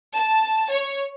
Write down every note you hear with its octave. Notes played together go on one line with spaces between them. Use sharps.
A5
C#5